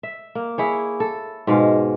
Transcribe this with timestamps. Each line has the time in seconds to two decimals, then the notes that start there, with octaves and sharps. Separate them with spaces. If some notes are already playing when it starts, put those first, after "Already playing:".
0.03 E5
0.35 A#3
0.58 E4 G#4 C#5
1.00 A4
1.47 G#2 B2 G#3 F5